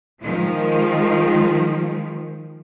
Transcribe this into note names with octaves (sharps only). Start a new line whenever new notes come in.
D#3 F3 G#3